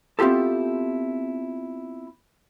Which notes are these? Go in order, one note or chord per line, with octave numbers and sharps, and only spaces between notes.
B3 C4 E4 F4 G4 A4